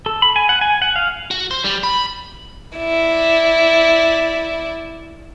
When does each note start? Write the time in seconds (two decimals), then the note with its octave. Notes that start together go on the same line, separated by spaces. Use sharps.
0.06 A4
0.22 B5
0.36 G#5
0.49 F#5
0.61 G#5
0.82 F#5
0.96 F5
1.31 F#4
1.51 C5
1.64 G3
1.83 B5
2.77 E4 D5